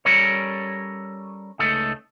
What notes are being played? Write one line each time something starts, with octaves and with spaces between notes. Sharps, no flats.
G3 C#4 A4 A#4 C#5
C#2 A3 D#4 A4